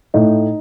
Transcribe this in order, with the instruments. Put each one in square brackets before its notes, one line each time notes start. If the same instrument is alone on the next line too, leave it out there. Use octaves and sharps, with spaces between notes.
[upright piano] A2 D#4